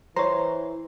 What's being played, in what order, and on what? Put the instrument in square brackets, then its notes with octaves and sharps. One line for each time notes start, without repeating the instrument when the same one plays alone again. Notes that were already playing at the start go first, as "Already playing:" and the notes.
[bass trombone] E3 [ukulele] C5 [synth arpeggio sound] C#5 A#5